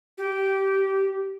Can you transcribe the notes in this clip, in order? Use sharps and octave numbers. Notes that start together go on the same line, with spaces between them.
G4